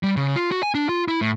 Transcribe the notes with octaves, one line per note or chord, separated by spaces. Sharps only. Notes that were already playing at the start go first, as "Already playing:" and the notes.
G3
C#3
F4
F#4
G#5
D4
F4
E4
A2